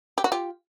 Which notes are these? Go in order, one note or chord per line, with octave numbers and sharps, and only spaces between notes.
G4
F#4
F4 G4